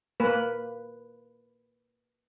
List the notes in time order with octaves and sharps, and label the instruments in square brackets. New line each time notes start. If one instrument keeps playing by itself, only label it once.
[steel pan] A#3 B4